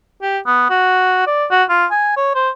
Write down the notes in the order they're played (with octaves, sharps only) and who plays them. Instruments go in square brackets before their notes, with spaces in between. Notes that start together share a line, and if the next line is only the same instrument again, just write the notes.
[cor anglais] G4
B3
F#4
D5
F#4
F4
G#5
C#5
C5